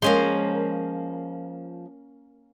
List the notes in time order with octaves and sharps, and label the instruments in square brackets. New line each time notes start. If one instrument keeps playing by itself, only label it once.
[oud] F3 G#3 [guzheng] A#3 C#4 C6